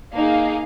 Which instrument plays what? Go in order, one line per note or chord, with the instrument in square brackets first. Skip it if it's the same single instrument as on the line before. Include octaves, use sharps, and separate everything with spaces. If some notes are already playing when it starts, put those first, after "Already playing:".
[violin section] A#3 D#4 G#4 F5